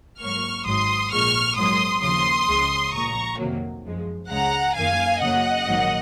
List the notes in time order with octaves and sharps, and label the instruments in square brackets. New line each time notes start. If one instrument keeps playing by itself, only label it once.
[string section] G#2 F#3 A#3 C#6 F6
G#1 G#2 F#3 C6 D#6
A#1 A#2 G#3 C#6 F6
G#2 F#3 A#3 C6 D#6
D#2 C#3 F3 A#3 C6 D#6
C#2 C#3 G#3
A#1 A#2 F3 A#5 C#6
F2 C3 D#3 F#3 A#3
F#2 F3 G#3
C#2 C#3 G#3 F#5 A#5
F#2 D#3 A#3 F5 G#5
F#2 C#3 F#3 A#3 D#5 F#5
A#1 G#2 D#3 F#3 A#3